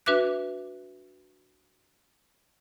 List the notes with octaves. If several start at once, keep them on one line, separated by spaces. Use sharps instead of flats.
D4 F#4 B4 E5 D6 F#6